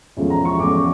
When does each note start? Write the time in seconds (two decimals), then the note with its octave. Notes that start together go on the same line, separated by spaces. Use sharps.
0.17 E2 C#3 F3 A3
0.30 A#5
0.45 C#6
0.59 E2 C#3 F3 A3 D6